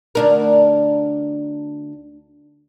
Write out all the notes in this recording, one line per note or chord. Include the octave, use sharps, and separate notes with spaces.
D2 D4 A#4